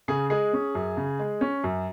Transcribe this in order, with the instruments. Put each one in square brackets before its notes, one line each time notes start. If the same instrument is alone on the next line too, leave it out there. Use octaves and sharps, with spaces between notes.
[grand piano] C#3 G#4
G#3 G#4
C#4
F#2
C#3
G#3
C#4
F#2